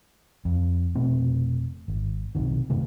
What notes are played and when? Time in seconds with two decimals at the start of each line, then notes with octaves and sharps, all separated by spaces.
0.45 F2
0.95 F1 B2 A3 C4
1.88 G#1
2.35 B1 C3 D#3
2.70 F#2 C3 D#3 A3